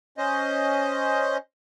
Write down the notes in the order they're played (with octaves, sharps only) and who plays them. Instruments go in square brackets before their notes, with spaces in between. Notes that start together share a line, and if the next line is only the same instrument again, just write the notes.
[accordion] C#4 C5 D#5